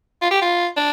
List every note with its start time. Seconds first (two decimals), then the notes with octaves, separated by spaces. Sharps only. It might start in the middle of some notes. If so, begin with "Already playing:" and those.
0.21 F4
0.31 G4
0.42 F4
0.77 D4